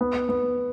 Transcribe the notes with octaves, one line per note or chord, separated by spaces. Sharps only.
B3
B3